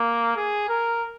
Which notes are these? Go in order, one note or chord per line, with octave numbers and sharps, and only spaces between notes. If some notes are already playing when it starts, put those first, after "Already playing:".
Already playing: A#3
G#4
A#4